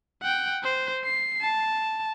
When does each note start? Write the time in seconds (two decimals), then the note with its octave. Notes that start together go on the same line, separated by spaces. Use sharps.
0.22 F#5 G5
0.64 C5
1.05 C7
1.42 A5